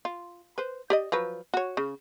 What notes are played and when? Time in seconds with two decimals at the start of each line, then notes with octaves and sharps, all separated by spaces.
0.05 F4
0.58 B4 C5
0.90 G4 D5 D#5
1.12 F3 F#3 B4
1.54 F#4 C#5
1.77 C#3